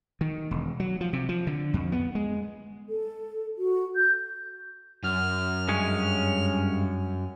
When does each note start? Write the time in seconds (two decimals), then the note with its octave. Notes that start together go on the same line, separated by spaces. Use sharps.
0.21 D#3
0.51 E1
0.80 F#3
1.01 F3
1.13 C3
1.29 F3
1.47 D3
1.74 F2
1.92 B3
2.15 G#3
2.89 A4
3.58 F#4
3.96 G6
5.03 F#2 F6
5.68 G2 G#3 C#4